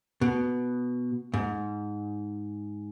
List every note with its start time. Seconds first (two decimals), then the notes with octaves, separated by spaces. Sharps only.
0.21 B2
1.34 G#2